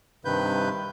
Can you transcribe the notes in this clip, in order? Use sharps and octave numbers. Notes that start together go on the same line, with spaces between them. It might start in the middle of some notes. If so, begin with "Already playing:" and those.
G2 C3 D#3 B4 G6